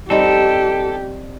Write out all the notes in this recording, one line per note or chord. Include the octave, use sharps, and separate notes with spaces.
G3 C4 D#4 G4 A4